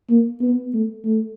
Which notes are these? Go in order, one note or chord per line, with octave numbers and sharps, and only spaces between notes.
A#3
B3
A3
A3